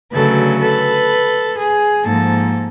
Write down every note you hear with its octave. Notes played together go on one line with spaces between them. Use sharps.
D2 C#3 F#3 A4 B4
A4 B4
G#4
G#2 F3 A#3 A4